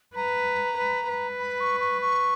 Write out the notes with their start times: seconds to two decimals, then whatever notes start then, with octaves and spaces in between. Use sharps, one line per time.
0.16 B4 A#5
0.78 B4
1.08 B4
1.39 B5
1.60 C#6
1.80 C#6
2.01 C#6